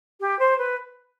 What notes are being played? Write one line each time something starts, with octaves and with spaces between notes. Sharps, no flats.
G4
C5
B4